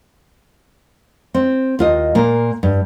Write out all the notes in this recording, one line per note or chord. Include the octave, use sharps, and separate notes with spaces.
C4
D#2 F4 D#5
A#2 A#3
G2